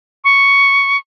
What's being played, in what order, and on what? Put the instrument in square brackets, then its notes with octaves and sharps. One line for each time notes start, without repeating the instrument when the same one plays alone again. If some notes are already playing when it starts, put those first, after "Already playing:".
[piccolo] C#6